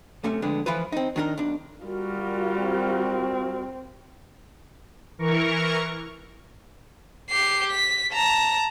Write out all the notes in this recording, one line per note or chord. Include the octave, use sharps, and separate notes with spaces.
F#2 C3 A3 C#4
F2 D3 G#3 B3 D4
E3 F3 E4 F4 B4
C4 D#4
D#3 D4 D#4 G#4 A#4
B1 D4
G3 F4 F#4 A#4
C4
E3 A#4 C#6
G4 C7
B6
A5 A#5